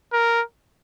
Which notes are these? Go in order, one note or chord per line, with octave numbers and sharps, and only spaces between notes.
A#4